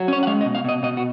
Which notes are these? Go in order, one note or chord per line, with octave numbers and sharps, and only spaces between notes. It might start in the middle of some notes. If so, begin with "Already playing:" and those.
Already playing: F#3
C#4 C#5
F#5
G#3 F5
D#5
B2
F5
B2 D#5
B2 D#5
F#4